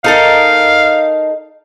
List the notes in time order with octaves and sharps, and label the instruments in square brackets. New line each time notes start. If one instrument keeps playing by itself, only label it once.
[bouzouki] D#4 A4 A#4 [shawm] F5